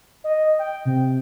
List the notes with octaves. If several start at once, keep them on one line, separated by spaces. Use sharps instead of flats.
D#5
G5
C3